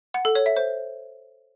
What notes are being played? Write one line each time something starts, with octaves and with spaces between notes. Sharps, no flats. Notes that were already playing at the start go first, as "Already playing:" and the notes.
F#5
A4
C#5
E5
C5